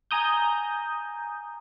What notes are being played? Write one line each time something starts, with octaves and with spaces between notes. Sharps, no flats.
G#5 A#5 D#6 G6